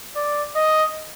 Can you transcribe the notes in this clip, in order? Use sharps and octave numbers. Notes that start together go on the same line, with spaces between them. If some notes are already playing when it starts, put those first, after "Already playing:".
D5
D#5